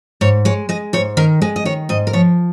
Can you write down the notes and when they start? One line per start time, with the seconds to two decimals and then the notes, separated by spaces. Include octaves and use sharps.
0.21 G#2 C#5
0.45 G#3 C#5
0.69 G#3 D#5
0.93 G#2 C#5
1.17 D#3 A#4
1.42 G#3 D#5
1.56 D#5
1.65 D#3 C#5
1.89 G#2 D#5
2.07 A#4
2.13 F3 C#5